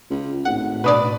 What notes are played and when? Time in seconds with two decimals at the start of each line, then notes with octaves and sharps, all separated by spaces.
0.10 C#2
0.45 G#1 A2 F#5
0.84 B2 D4 B4 D5 D#6